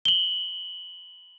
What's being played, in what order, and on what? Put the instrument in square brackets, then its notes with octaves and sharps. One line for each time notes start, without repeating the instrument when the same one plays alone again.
[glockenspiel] F#7 G7